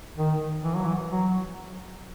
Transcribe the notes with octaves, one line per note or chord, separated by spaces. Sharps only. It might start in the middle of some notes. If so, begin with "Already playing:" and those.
D#3
E3
F#3
E3
F#3